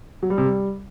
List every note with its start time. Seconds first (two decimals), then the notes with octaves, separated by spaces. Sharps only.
0.23 F#3
0.30 G3
0.38 C3
0.45 G3